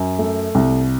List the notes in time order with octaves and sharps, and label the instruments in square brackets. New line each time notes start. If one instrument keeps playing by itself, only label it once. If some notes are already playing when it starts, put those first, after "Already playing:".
Already playing: [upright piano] F#2
A3
C2